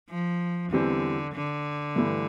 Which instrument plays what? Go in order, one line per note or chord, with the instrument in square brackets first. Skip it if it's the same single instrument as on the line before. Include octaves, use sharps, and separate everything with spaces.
[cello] F3
[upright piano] E2 E3 G3 C4 [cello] D3
[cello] D3
[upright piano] G2 E3 A3